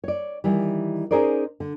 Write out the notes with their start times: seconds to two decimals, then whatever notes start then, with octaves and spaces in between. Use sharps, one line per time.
0.04 C#5 D5
0.44 D#3 E3 G3
1.11 C#4 D#4 G#4 A#4 C5 D5
1.60 D3